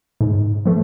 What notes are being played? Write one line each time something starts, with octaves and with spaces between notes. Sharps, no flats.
G#2
F3 A3